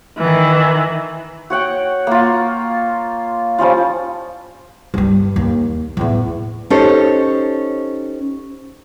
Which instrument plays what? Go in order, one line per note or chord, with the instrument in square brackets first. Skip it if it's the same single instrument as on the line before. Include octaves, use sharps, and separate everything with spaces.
[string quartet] D#3 E3
[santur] F#4 C#5 F#5 G5
A#3 F4
F3 G3 C#4 F4
[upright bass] G2 G3
D#2
E2 A2
[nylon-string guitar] C#4 D#4 G4 A4 C5 C#5